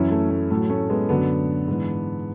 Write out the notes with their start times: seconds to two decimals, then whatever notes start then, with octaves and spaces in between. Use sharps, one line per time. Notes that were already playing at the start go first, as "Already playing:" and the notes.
Already playing: F#2 E3 C#4 E4
0.11 A3
0.31 A3
0.50 A2 F#3 A3
0.70 A3 C#4
0.89 G#3 B3
1.09 F#2 D3 F#3 B3 D4
1.68 G#2 E3